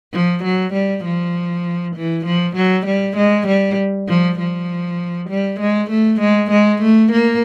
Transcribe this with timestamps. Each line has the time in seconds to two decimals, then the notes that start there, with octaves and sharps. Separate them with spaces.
0.13 F3
0.44 F#3
0.74 G3
1.04 F3
1.96 E3
2.26 F3
2.56 F#3
2.86 G3
3.17 G#3
3.48 G3
4.08 F3
4.39 F3
5.30 G3
5.61 G#3
5.91 A3
6.21 G#3
6.51 G#3
6.82 A3
7.12 A#3